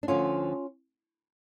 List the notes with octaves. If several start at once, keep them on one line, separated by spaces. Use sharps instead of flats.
D4
D2 D3 F3 C#4 F4